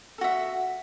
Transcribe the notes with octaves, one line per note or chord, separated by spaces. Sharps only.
F#4 A4 E5